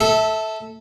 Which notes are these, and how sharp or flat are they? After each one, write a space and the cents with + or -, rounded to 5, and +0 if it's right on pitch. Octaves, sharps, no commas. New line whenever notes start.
A4 +0 E5 -20